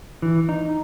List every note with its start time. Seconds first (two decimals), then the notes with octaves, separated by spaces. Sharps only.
0.22 E3
0.49 D#4